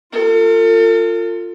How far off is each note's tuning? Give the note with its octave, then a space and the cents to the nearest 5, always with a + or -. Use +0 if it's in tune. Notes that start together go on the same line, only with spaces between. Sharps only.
F4 +0 A4 +40